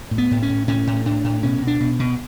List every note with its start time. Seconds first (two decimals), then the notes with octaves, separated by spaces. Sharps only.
0.11 A2
0.18 B3
0.31 A2
0.42 C#4
0.49 A2
0.67 A2 C#4
0.87 A2
1.05 A2 D4
1.24 A2
1.43 B2 C#4
1.61 B2
1.67 D4
1.80 B2
1.99 B2